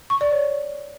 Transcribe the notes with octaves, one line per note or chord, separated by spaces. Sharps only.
C#6
D5
C#5